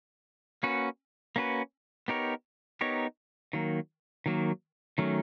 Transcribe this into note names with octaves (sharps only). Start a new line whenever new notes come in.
A#3 C#4 F#4 B4
A#3 C#4 F#4 B4
B3 D#4 G4 A#4 C#5
B3 D#4 G4 A#4 C#5
D#3 F#3 A#3
D#3 F#3 A#3
D#3 F#3 A3 C#4